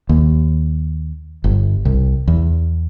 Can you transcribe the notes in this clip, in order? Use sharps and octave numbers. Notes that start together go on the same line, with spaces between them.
D#2
G1
C2
E2